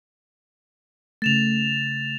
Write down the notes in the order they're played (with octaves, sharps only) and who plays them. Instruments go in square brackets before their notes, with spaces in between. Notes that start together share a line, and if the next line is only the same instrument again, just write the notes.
[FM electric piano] C#3 A3 [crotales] A6 E7 F7